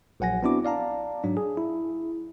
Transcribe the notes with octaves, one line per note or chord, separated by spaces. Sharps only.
A#1 F#3 F#5 G#5 A#6
B3 C4 D4 E4 F#4 D6
D5 F5 A5 A#5
G#2 F#3 D4
G#4
E4